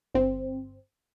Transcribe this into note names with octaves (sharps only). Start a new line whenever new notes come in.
G1 C4